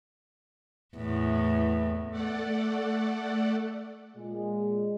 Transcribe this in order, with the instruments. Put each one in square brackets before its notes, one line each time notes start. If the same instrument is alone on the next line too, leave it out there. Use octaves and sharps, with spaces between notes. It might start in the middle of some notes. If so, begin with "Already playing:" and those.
[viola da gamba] E2 A2
[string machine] A3 A4 D5 F#5
[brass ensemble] A#2 G#3